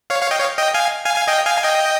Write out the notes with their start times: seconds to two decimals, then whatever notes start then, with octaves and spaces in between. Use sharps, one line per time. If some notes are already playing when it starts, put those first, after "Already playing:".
0.10 C#5 F5
0.22 C#5 F5
0.31 D#5 G5
0.39 C#5 F5
0.57 D#5 G5
0.74 F5 G#5
1.05 F5 G#5
1.16 F5 G#5
1.28 D#5 G5
1.45 F5 G#5
1.58 G#5
1.63 D#5 G5